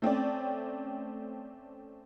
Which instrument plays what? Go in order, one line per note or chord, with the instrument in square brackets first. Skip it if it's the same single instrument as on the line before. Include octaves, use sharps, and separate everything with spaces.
[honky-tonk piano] A3 C4 C#4 D5